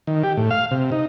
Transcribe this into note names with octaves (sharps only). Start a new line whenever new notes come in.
D#3
G4
A2
F5
C3
D#4